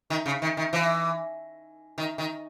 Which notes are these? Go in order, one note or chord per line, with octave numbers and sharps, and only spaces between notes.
D#3
C#3
D#3
D#3
E3
D#3
D#3